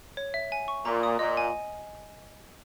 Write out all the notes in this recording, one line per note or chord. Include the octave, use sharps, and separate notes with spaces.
C#5
E5
G#5
C#6
A#2 A#5
D#6
A#2 D#5
G#5